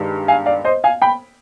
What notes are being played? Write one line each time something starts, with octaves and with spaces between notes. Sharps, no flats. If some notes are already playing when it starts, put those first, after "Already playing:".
Already playing: G2 D#3 G#3
F5 G#5
D5 F5
C5 D#5
F5 G#5
G5 B5